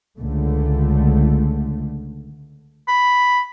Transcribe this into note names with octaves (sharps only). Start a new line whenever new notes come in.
C#2 D3 A3
B5